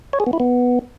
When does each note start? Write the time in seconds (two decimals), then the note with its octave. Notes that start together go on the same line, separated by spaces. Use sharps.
0.13 C#5
0.20 G#4
0.27 B3
0.33 E4
0.40 B3